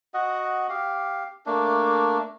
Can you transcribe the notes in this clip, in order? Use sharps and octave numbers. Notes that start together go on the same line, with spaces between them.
F#4 D#5 F#5
G4 F5
A3 A#3 D4